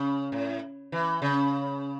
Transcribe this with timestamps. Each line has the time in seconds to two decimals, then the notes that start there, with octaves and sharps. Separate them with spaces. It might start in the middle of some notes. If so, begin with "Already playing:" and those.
Already playing: C#3
0.32 A2
0.92 E3
1.22 C#3